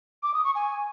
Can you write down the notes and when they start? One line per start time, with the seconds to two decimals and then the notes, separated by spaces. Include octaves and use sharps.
0.23 D6
0.34 D#6
0.44 C#6
0.55 G#5